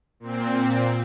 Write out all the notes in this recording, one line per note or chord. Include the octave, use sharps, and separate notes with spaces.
A#2 C4